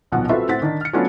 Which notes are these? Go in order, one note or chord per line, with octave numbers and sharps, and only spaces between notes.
D#1 B1 B2 F3 F#5
C4 F4 F#4 A4 B4 E5
A2 C4 F#5 A6 B6
D#3 D4
F6 C#7
F#3 A3 B3 C#4 D4 F4